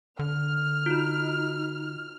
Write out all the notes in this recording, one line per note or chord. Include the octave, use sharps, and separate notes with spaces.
D3 F6
D#4 F4 F#4